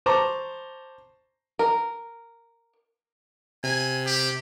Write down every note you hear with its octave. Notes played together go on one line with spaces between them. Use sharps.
C5 A5 A#5 C#6 D6
A#4
C3 G#5
G4